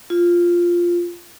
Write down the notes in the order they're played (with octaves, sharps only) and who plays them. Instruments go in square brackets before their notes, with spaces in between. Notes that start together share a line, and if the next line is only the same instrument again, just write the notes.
[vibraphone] F4